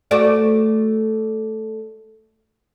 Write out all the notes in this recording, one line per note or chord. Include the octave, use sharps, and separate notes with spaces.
A3 F#4 D5